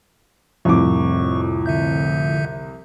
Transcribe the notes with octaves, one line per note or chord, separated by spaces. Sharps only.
C2 F2 A2 C#6 D6
D3 E5 G6